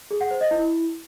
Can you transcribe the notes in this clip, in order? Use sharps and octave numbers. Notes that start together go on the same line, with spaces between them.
G#4
F#5
C5
D#5
E4